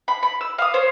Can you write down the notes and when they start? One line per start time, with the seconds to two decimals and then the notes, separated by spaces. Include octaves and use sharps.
0.08 B5
0.23 B5
0.41 E6
0.58 F5 D#6
0.74 C5 C#5